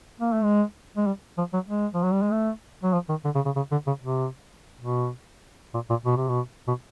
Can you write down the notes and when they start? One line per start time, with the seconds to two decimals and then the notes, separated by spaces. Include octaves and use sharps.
0.21 A#3
0.33 A3
0.44 G#3
0.97 G#3
1.07 G3
1.38 F3
1.54 F#3
1.68 G#3
1.94 F3
2.04 F#3
2.13 G3
2.22 G#3
2.31 A3
2.83 F#3
2.93 F3
3.09 D#3
3.25 D3
3.35 C#3
3.46 C#3
3.56 C#3
3.72 D3
3.87 C#3
4.03 C3
4.81 B2
5.74 A#2
5.90 A#2
6.06 B2
6.17 C3
6.28 B2
6.68 B2